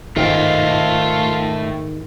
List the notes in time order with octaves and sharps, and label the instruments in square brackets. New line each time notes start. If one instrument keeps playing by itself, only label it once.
[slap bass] G#2 D#3 [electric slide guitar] A3 A4 G5 [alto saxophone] F4